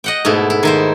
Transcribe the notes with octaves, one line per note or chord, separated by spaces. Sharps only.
D#5 F#5 G5
G#2 B2 A3 E4
E4
D#3 E4 C5